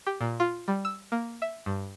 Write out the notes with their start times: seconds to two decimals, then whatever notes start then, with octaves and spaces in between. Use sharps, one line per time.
0.06 G4
0.21 A#2
0.40 F4
0.68 G3
0.85 E6
1.12 A#3
1.42 E5
1.66 G2